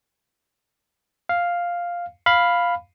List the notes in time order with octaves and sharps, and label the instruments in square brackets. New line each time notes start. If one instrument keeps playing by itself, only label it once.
[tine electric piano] F5
F5 B5